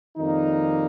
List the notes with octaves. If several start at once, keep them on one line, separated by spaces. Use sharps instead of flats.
F2 D#3 G3 A#3 D#4